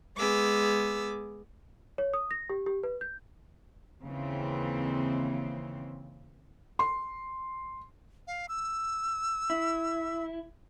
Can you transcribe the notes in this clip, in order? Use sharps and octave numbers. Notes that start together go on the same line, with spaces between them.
G#3 B3 G#4 D6 E6
C#5
D#6
A#6
G4
G4
B4
G6
D#2 C#3 E3 C4
C6
F5
E6
E4